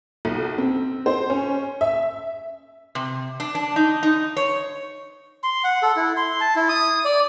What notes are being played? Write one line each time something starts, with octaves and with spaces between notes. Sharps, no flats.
B1
C4
C5
C#4
E5
C3
D4
D4
D#4
D#4
C#5
C6
F#5
A4
E4
C6
A5
E4
D#6
D5